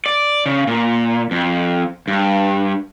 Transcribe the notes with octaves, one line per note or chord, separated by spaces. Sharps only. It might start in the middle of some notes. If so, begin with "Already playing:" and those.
D5
C#3
A#2
F2
G2